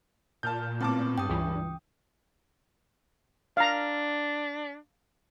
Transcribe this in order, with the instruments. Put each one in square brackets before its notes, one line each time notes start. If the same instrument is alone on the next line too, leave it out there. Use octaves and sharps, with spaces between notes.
[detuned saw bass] A#2 [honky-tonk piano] A5 F6 G6
[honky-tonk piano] A2 A5 D6 [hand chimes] B3 C4
[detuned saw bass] G2 [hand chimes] G5 D#6
[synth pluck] C#2 E3
[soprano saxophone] D4 [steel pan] F5 A#5